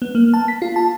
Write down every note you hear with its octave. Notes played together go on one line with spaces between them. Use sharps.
B3
A#3
A5
B6
F4
A5